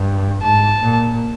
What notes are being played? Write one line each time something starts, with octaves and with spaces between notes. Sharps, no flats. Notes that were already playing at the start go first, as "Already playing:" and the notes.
Already playing: G2
G#2 A5
A#2